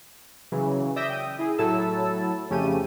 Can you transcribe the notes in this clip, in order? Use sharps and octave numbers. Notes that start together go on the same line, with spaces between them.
C#3 E3 F#3
D5 E5 D#6 E6 G6 A#6
G5 D#6
E4 G#4
A2 F#3 E4 A4 A5 E6
F2 C#3 A3 C#4 G4 D#7